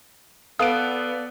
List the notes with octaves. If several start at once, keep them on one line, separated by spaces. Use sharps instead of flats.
B3 A4 D5 F5 D#6 D7